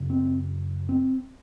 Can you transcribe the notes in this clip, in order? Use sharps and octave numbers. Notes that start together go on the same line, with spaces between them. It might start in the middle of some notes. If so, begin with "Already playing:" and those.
Already playing: F#2 C#3
C4
C4